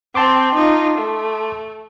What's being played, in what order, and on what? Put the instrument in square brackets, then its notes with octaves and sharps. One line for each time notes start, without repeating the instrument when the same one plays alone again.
[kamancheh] C4 [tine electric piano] A5 C6 D6
[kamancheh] D#4 F4
A3